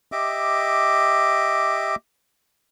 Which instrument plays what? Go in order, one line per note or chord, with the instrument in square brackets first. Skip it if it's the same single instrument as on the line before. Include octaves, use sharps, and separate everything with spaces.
[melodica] G4 D#5 E5 D6